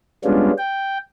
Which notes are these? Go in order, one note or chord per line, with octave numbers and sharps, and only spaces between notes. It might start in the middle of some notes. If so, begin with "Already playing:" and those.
G3 G#3 B3 C#4 D4 F4
G5